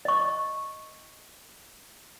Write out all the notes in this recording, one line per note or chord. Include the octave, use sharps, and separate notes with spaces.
D#5 C#6